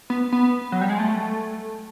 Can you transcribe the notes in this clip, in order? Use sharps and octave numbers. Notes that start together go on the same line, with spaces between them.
B3
B3
F#3
G3
G#3
A3